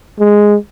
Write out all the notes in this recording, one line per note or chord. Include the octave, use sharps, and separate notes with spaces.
G#3